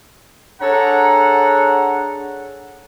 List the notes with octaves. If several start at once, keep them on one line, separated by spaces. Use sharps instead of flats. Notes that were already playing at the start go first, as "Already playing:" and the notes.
D4 G#4 A4 C#5 F#5 A#5